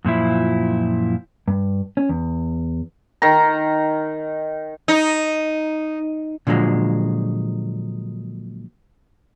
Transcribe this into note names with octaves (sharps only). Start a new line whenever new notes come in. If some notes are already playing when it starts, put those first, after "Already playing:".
F#2 A#2 F3 E4
G2
C#4
E2
D#3 A#5
D#4
A#2 D3 F3 F#3 G#3